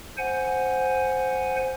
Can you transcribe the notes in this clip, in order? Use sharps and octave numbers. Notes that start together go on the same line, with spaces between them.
C5 F#5 G#5